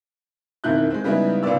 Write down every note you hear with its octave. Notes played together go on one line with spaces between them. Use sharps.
E1 F2 D#3 E4 F#6 G6
G#3 C4
C#3 G3 G#3 B3 D#4 E4
C#2 G#2 B3 F4 D5 E6